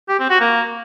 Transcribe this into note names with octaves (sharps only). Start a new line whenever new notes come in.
G4
C4
F#4
A#3